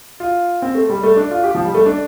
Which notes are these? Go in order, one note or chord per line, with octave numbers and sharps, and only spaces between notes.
F4
C4
A3
G3
A3
D4
F4
G4
F3
G3
A3
D4